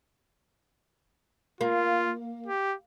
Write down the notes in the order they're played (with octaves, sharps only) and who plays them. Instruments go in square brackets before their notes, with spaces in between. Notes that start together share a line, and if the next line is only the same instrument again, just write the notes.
[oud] A#3 [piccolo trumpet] F4
[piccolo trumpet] G4